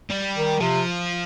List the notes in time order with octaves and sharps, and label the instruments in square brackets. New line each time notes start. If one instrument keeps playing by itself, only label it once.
[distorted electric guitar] G3
[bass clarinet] D#3
[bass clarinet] C3 [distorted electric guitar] F3